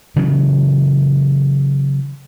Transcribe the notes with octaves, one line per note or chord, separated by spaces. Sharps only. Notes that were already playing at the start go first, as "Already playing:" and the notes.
C#3 E3 F#3